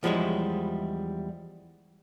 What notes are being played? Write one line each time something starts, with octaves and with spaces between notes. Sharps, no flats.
E2 F3 G3 G#3 E4 C#5